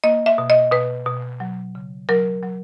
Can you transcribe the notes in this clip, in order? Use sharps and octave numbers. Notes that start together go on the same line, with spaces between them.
A#3 D#5
E5
B2
D#5
B2 B4
B2
F#3
C#3
F#3 A#4
F#3